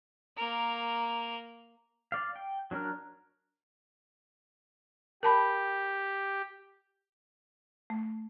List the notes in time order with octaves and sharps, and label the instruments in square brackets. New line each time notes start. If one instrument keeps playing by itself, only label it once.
[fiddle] A#3 A#4
[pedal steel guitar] D5 F5
G5
F#3 D4 A#4 F6
[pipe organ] G4 [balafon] A#4 A5 B5
[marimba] A3